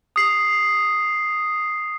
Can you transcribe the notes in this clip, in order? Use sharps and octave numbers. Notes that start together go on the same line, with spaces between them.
D#6 C7